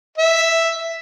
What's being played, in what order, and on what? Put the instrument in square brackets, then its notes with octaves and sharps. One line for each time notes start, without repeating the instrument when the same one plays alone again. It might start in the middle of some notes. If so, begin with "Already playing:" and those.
[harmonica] E5